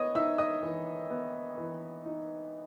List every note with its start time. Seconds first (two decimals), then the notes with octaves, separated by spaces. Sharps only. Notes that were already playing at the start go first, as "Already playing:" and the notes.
Already playing: B3 C#5 D#5 D#6
0.15 D#4 E5 E6
0.38 D#5 D#6
0.63 E3
1.10 B3
1.58 E3
2.05 D#4